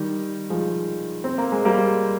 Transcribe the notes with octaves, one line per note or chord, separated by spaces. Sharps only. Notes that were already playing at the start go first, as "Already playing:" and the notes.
Already playing: D#3 G3
F3 G#3
C4
A#3
G#3
G3 A#3